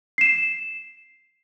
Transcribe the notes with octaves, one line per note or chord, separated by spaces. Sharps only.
C7 E7